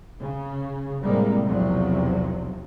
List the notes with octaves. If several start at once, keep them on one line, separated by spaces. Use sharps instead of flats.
C#3
A2 C3 G3 G#3 A#3 C4
B1 E2 C3 F3 F#3